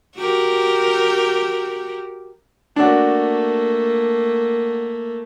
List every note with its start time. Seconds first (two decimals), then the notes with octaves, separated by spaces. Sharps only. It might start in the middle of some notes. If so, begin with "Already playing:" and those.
0.16 F#4 G4 A#4
2.76 A3 A#3 D4 F#4